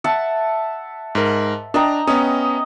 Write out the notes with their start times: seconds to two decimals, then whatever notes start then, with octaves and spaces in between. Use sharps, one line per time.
0.04 E5 F#5 A5
1.15 G#2 A#4
1.74 D4 D#5 G5 A#5
2.07 B3 C#4 D#5